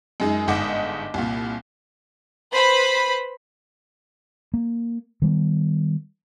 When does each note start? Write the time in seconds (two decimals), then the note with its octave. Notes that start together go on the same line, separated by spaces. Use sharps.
0.20 F#2 G#3 D#4
0.48 G1 G#2 D#5 F#5 D6
1.14 C2 A#2
2.52 B4 C5 B5
4.54 A#3
5.22 D#3 G3 B3